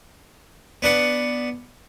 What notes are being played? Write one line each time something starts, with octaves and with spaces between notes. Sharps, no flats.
B3 D4 F#5